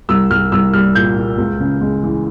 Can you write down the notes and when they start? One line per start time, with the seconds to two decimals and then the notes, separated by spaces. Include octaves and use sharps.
0.09 C2 E6
0.30 C2 F6
0.52 C2 E6
0.73 G3 F6
0.95 A#2 G6
1.16 A#2
1.38 C#2
1.60 C#3
1.81 G#3
2.03 E3